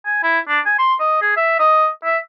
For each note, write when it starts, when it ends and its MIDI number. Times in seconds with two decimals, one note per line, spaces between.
0.06 0.22 80
0.23 0.40 64
0.48 0.60 62
0.66 0.75 80
0.78 0.95 84
1.00 1.19 75
1.22 1.35 68
1.37 1.58 76
1.59 1.88 75
2.05 2.18 76